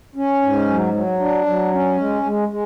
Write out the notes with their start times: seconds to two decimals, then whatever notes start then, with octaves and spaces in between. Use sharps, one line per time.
0.15 C#4
0.42 G#2
0.68 F#3
0.93 F#3
1.20 D4
1.46 F#3
1.71 C#4
1.97 G#3
2.22 G#3
2.48 G#3